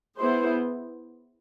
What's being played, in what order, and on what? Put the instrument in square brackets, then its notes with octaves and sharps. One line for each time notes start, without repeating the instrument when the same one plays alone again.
[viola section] B3 E4 G#4 C5